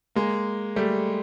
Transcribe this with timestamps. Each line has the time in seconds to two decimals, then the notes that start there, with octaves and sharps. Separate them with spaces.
0.15 G#3 A#3
0.76 G3 A3